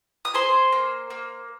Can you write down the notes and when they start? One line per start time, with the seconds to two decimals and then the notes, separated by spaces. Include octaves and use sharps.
0.25 D#6
0.34 G#4 C5 C6
0.72 A#3
1.10 A#3